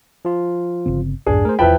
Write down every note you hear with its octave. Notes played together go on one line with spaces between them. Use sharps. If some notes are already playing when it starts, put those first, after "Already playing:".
F3 F4
G1 C#3 C4
B1 F2 G#2 D4 G#4
A3 A#4 C5
D#1 E2 F3 E4 B4 G5 A5 B5